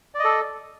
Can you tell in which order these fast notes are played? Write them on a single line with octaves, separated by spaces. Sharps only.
D5 D#5 A4